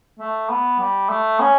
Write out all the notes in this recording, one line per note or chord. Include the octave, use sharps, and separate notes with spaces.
A3
B3
G3
A3
C#4